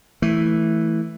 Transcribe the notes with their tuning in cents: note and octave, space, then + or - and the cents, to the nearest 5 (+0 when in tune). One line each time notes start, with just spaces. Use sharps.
E3 -5 A3 +0